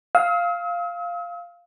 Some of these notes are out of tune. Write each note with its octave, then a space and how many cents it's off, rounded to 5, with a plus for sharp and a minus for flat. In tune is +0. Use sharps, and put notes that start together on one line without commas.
F5 +0 E6 -45